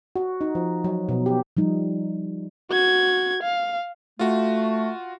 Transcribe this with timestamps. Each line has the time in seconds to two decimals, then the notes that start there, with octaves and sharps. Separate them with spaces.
0.16 F#4
0.41 D#4
0.55 F3
0.84 F#3
1.09 B2
1.26 G4
1.57 F3 G3 D#4
2.71 F#4 G#6
3.43 F5
4.19 A3 F4 F#4